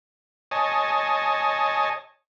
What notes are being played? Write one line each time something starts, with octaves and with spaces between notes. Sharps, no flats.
C#5 D#5 G#5 A5